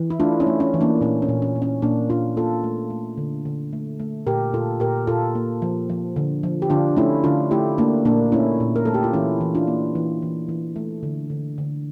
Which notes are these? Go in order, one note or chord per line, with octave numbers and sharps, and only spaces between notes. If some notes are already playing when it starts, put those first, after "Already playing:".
Already playing: E3
E4
A3 D4 F4
C#4 E4
A3
C#4
E3
A#3 D4
A#2 C#4
C#4
A#2
C#4
A#2
C#4
A#2 A#3 D4
A#2 D4 F4
A#3 F4 A4
A3
A3
D3
D3
A3
A3
A#2 G4 A#4
A#2 F4 A4
A#2 G4 A#4
A#2 F4 A4
A#3
F3
F3
D3
F3
G4
D3 D4 F4
A3 C#4 E4
D3 D4 F4
A3 E4 G4
A3 A#3 D4
A#2 A#3 D4
A3 C#4 E4
A#2
A#4
A3 A4
G4
F4
E3 C#4 E4
E3
D4 F4
A#3
E3
E3
E3
A3
D3
D3
D3